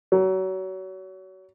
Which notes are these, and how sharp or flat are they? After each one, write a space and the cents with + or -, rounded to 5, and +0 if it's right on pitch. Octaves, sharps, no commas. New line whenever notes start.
F#3 +35